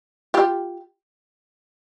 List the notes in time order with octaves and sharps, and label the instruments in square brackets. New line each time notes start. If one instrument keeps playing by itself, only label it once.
[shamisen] F4 G4